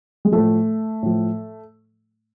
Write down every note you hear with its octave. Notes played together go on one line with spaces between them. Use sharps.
G#3
A2 F3 A3
A2 F3